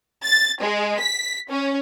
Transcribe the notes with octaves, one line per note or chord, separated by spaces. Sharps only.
A6
G#3
B6
C#4